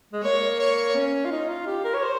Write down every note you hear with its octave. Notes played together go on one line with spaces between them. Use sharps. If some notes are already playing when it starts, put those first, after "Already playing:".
G#3
A#3 C#5
C#5
C#4
F4
D#4
F4
G4
A#4
C#5
C5